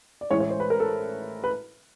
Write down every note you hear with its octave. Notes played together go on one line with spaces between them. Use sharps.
D5
A1 A2 E3 G#3 C#5
C#5
C5
B4
A#4
A4
B4